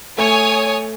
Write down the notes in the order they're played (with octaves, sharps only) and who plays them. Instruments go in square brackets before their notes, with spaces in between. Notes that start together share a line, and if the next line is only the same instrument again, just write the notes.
[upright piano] A3 [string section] C#5 G#5 D#6